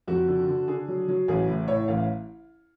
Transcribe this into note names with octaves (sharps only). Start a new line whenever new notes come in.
F2 F#4
D3
D3
D3 G#4
F#3
F#3
A1 G#4
A2
A2 C#5
A1 F5